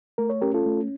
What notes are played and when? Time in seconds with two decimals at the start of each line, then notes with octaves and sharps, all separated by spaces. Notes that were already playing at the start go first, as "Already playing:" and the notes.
0.18 A3 A#4
0.30 C#5
0.42 C#4 G4 A#4
0.54 F4 A4
0.66 A3